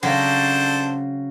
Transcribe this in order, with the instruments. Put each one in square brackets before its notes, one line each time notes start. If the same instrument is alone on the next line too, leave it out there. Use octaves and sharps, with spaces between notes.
[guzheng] C#3 F#3 C4 [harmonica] D4 A4 C5